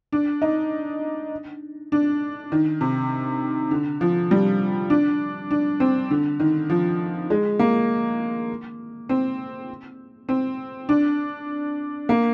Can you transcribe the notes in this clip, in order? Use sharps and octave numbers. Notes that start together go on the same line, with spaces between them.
D4
D#4
D4
D#3
C3
D3
F3
G3
D4
D4
C4
D3
D#3
F3
G#3
A#3
C4
C4
D4
A#3